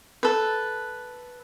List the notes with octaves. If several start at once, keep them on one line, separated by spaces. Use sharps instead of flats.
A4 B4